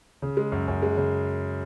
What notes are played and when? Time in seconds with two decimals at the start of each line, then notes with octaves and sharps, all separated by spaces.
0.22 C#3
0.37 G#3
0.52 F#2
0.68 F#2
0.82 G#3
0.97 C#3